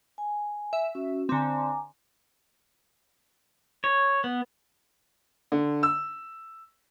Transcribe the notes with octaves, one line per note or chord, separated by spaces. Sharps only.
G#5
E5
C#4 F#4
D3 C4 G#5 A#5 D6
C#5
B3
D3
E6